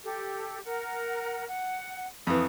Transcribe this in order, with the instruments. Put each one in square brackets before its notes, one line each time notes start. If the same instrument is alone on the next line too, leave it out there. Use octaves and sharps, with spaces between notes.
[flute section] G4 A4
A#4 F#5
F#5
[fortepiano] F2 E3 [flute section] D#6